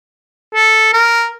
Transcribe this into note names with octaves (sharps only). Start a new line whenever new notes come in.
A4
A#4